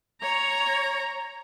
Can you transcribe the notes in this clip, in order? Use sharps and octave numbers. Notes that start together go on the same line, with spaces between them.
C#5 A#5